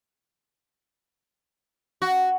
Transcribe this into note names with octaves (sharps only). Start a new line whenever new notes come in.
F#4